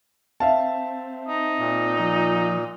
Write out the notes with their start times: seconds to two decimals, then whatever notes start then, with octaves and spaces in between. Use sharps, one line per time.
0.40 C4 E5 F5 A5
1.28 D#4
1.59 A#2
1.99 F3